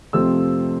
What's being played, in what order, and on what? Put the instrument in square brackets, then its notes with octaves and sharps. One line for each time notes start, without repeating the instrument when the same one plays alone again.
[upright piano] F2 C3 F3 A3 C4 E6